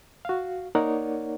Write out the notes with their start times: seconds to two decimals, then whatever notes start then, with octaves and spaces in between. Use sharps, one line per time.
0.25 F#4 F5
0.75 A#3 D#4 A#4 C#5 D5 F#5